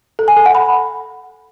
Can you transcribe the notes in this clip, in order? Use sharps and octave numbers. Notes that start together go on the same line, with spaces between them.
A4
G#5
A4
F#5
B5